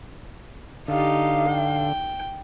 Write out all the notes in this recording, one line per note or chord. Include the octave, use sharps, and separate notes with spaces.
D3 D#4 G4 F5
G5